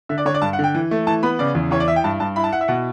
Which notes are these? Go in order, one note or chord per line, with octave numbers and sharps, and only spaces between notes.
D3 E5
D5
D3 C#5
D5
G2 A5
F#5
D3 G5
E3
A3
E3 A5
B3 B5
C#3 D5
E2
E3 C#5
D5
E4 E5
G5
G2 A5
G2 A5
E4 B5
A5
E4 F#5
E5
B2 F#5